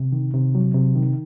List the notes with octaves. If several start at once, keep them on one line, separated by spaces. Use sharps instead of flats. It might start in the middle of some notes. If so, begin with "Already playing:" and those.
Already playing: C3
D#3
C3
F#3
C3
D#3